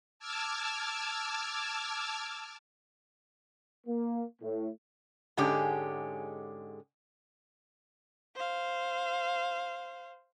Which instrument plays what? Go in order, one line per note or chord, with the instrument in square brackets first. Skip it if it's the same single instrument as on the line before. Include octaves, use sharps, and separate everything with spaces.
[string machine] A5 D6 E6 F6 G#6
[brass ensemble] A#3
A2
[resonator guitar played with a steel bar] G#2 D3 G#3 C#4 G4
[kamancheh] C5 F5